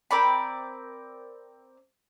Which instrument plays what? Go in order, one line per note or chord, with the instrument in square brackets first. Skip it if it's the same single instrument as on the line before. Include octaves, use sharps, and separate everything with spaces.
[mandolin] C4 A#4 D5 B5